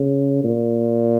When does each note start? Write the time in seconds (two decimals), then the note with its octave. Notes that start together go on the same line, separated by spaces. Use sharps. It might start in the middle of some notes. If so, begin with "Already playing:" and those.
Already playing: C#3
0.44 A#2